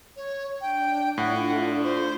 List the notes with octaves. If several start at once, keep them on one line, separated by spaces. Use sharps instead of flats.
C#5
D4 G5
A2 A3 D4 F4 F#5
C5